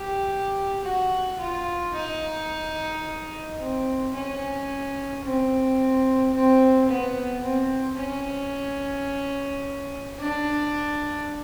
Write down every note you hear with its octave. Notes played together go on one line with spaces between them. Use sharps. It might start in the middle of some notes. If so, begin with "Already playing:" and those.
Already playing: G4
F#4
F4
D#4
C4
C#4
C4
C4
B3
C4
C#4
D4